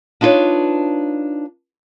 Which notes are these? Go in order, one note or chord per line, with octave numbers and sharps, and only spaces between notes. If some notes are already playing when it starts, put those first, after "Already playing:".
D4 D#4 F4 F#4 B4 C#5